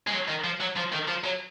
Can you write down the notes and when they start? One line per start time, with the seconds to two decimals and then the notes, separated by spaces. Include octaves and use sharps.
0.07 G#3
0.12 F#3
0.28 D#3
0.44 F3
0.60 F#3
0.76 F3
0.92 D#3
1.08 F3
1.24 F#3